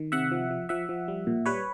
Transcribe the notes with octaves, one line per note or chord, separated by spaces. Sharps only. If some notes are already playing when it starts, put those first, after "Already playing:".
Already playing: D#3
C3 E5 F#5
F3
F3
F3 E5 F#5
F3
G3
A#2
G3 B4 C#5